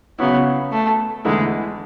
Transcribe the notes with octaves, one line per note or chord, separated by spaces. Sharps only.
C#3 F#3 B3 C#4 E4
A3
E2 D3 G#3 A3 E4